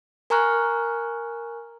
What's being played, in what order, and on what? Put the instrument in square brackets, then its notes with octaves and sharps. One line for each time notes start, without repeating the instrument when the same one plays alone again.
[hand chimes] A#4 G#5 A#5 C#6 F6 F#6